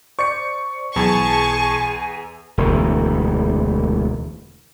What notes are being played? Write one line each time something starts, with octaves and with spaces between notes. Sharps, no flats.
C5 D5 C#6 C#7
B1 E2 G#4 G#5 A5 C#6 G#6
E1 D2 E3